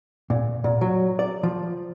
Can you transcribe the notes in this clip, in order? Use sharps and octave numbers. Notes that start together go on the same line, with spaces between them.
A#2
A#2
F#3
D5
F3